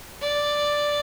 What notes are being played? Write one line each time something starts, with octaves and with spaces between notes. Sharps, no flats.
D5